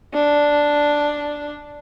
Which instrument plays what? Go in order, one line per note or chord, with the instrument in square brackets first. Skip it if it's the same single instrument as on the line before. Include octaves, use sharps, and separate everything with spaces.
[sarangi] D4